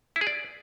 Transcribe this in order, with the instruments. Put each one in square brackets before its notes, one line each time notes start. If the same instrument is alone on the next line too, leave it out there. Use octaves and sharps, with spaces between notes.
[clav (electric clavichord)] E4
G#4
D5